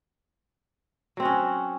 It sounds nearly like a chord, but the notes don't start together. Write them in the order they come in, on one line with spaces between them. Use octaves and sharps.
F#3 C4 F#4 C#4